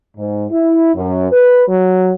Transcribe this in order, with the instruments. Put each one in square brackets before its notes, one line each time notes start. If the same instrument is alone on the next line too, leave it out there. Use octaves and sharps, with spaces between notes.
[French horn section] G#2
E4
F#2
B4
F#3